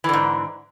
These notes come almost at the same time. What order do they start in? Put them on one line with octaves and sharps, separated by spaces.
E3 D3 G#2